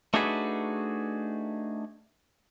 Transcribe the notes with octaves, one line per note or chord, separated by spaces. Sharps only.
A3 D4 D#4 F#4 G#4 B4